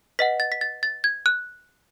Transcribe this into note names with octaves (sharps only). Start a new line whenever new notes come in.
B4 D#5 F#5 B6
A6
B6
A6
A6
G#6
F#6